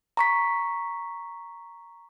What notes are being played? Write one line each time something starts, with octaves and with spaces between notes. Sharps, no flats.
A#5 C#6 B6